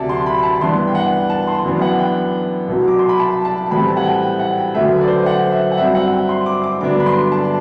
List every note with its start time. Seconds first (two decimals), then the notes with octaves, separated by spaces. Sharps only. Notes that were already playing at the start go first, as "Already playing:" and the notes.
Already playing: D2 C3 F#3 D5 E5 A5
0.09 C6
0.26 B5
0.38 B5
0.43 A5
0.61 G2 E3 B3 D4 C6
0.87 G5
0.95 F#5
1.30 A5
1.47 C6
1.63 F#2 E3 B3 D4
1.82 F#5
1.99 G5
2.68 C2 B2 F#3
2.88 D6
2.99 C6
3.09 B5
3.19 A5
3.45 A5
3.70 A2 E3 G3 C4 B5
3.88 A5
3.97 F#5
4.05 G5
4.22 G5
4.39 F#5
4.57 G5
4.74 F#2 D3 F#3 A3 E5
4.92 B4
5.01 D5
5.08 C5
5.26 F#5
5.51 E5
5.72 F#5
5.78 G2 F#3 C4 E5
5.95 F#5
6.12 G5
6.29 C6
6.46 D6
6.64 D6
6.81 G2 D3 F#3 B3 D4 D6
7.00 B5
7.06 C6
7.32 A5